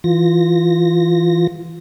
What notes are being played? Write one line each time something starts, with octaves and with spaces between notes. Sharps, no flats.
E3 F4 A#6